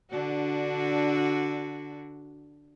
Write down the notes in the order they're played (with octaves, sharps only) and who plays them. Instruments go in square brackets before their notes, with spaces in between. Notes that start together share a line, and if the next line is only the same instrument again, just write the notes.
[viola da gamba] D3 D4 F#4